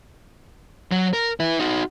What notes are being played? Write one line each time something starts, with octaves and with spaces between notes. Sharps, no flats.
F#3
A#4
E4 B4
D#4 F#4